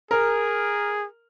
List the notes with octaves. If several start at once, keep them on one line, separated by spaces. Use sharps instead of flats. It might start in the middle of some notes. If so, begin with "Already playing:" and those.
G#4 A#4